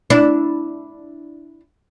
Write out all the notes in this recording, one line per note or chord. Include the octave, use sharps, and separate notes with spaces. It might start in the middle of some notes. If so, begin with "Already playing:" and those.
D4 E4